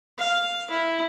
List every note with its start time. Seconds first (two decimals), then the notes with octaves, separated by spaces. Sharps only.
0.18 F5
0.71 E4